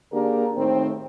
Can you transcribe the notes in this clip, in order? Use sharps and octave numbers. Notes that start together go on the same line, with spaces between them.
D3 A#3 D4 G4 G#4 A#4
A2 D#3 C4